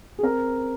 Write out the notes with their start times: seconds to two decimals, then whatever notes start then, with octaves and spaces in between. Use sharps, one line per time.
0.19 G#4
0.23 C4 A#4